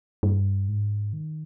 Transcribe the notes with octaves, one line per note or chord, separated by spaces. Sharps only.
G2
G#2
D#3